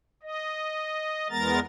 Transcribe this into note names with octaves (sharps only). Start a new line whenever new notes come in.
D#5
E2 G#3 B3 A#4 A#5 A6